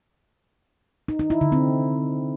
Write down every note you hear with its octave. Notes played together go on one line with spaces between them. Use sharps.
D#4
D#4
E4
D3
C4